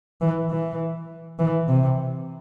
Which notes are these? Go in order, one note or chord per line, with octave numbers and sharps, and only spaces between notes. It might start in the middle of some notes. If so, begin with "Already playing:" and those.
E3
E3
E3
C3